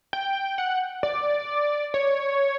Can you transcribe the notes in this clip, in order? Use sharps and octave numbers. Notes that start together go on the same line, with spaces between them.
G5
F#5
D5
C#5